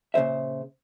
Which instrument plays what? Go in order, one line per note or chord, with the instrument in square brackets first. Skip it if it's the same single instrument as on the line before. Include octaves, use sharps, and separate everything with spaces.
[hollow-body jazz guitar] A#2 C#3 F#3 C5 E5